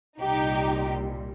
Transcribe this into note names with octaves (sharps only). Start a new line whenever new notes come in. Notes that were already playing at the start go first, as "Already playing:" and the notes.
C2 A#2 G3 D#4 G4